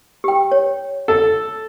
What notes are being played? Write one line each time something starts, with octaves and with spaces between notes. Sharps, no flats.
G4 G5
C#5
A4